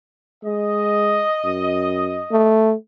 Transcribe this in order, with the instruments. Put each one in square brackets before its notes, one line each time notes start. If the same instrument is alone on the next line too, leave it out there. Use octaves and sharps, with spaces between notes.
[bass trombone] G#3 [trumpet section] D#5
[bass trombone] F#2
A3